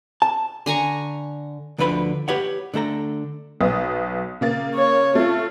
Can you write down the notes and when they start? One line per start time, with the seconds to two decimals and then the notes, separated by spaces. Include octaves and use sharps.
0.22 A5
0.66 D3 G#5 A#5 C#6
1.78 D2 D3 F3 B4 D#5 B5
2.28 G4 B4 C#5 F#5
2.74 D3 A3 A4 A#5
3.61 B1 B3 D#6
4.41 C#3 A#3 A6
4.75 C#5
5.15 A3 F4